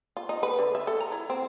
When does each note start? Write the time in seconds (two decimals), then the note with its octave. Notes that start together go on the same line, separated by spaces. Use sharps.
0.17 F4
0.29 D#4
0.43 B4
0.59 D3
0.75 E5
0.87 A4
1.00 A#5
1.12 E4
1.30 C4